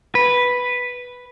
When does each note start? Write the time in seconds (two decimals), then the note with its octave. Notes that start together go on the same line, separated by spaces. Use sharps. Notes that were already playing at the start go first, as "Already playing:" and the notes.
0.15 B4